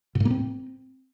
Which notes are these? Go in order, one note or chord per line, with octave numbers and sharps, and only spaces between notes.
A#2
A2
A#3
C4